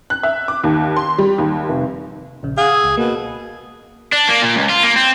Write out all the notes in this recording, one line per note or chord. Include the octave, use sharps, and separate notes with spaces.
F#6
E5
D6
D#2
C6
G3
D#2
F1
A#1 C#3
G#4 F5 F#5
E6
C#2
B2 A#3
D4
A#3
A#2
C#2
F4
A#3
C4